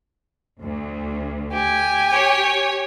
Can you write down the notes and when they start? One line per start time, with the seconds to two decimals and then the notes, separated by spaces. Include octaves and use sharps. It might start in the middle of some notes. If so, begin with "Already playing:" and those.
0.60 D2
1.52 G4 G#5
2.14 C#5